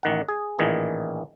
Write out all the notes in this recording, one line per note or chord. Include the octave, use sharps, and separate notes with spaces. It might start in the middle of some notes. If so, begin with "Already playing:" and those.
A1 D#3 F#5
G#4
A1 A#2 D#3 E3 G#4